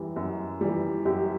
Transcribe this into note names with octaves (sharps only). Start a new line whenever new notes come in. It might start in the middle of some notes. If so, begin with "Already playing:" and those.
Already playing: F#2 E3 G3
F#2
E3 G3
F#2 G4